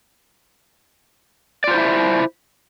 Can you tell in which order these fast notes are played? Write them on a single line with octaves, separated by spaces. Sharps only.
D5 F4 C5 E4 E5